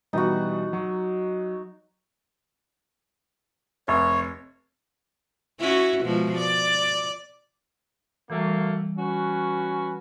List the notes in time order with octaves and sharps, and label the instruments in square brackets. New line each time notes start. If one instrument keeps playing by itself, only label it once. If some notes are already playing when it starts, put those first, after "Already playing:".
[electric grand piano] B2 E3 G3 [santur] D#4 F#4
[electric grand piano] F#3 C#6
[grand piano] F1 [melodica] C#5
[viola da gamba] C#4 E4 F#4
B2 F3 G#3
D5
[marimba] E3 G3 [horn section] F#3 A3 A#3
[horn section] C#4 F#4 B4